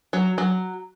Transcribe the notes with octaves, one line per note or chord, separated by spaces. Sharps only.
F#3
F#3